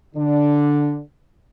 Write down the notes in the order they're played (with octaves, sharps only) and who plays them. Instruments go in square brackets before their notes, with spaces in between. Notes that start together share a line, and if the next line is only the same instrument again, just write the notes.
[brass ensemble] D3 D4